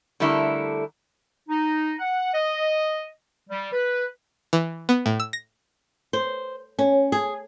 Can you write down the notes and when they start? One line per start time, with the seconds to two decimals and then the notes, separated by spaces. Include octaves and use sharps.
0.20 D3 G3 A3 E4 A4 A#4
1.49 D#4
1.99 F#5
2.34 D#5
3.50 G3
3.73 B4
4.53 E3
4.89 B3
5.06 A2
5.20 E6
5.33 A#6
6.13 C5
6.79 C#4
7.12 G#4